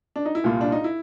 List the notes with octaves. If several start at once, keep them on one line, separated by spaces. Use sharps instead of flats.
D4
D#4
E4
C2 A#2 F4
D4
D#4
E4